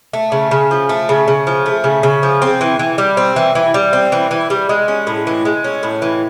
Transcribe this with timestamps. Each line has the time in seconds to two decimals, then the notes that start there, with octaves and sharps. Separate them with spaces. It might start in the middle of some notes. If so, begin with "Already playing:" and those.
0.13 A3
0.32 C#3
0.51 C#3
0.71 F3
0.89 A3
1.09 C#3
1.28 C#3
1.47 F3
1.66 A3
1.84 C#3
2.03 C#3
2.23 F3
2.42 C4
2.61 E3
2.79 E3
2.98 G3
3.17 C4
3.36 E3
3.55 E3
3.74 G3
3.93 C4
4.12 E3
4.31 E3
4.50 G3
4.69 G#3
4.88 C#4
5.07 A2
5.27 E3
5.45 G#3
5.64 C#4
5.83 A2
6.02 E3